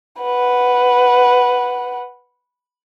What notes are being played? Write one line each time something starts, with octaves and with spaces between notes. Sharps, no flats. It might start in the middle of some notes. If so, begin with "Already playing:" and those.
B4 F#5